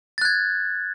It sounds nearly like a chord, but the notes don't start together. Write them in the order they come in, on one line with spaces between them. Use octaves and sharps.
A6 F#6 G#6